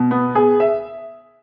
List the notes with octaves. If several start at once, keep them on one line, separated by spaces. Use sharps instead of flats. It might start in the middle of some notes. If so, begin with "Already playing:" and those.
Already playing: B2
B3
G#4
E5